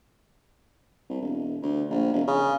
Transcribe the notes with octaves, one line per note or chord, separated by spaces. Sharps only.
C2
E1
D2
A#1
E1
C#3